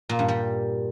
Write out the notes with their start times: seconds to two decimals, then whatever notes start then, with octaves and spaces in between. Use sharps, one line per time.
0.09 A#2
0.19 G2
0.28 G3